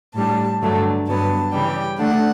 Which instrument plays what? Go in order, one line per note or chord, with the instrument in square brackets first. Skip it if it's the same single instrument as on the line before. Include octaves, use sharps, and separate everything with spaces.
[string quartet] A2 G3 D4 A5
G2 D3 F#3 A3 D4
G2 D3 F#3 B3 A5
C#3 E3 G3 G5
D3 A3 D4 F#5